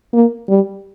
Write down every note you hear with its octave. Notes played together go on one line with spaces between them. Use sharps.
A#3
G3